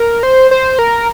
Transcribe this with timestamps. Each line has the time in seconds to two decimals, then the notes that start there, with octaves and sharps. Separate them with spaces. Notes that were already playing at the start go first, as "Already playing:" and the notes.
Already playing: A#4
0.23 C5
0.51 C5
0.79 A#4